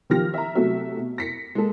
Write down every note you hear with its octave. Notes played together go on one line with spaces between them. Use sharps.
D#3 F3 G4 F6 A#6
E5 A#5
C3 F#3 A3 F#4 E5
B2
A#6 B6 C#7
G#3 A#3 A4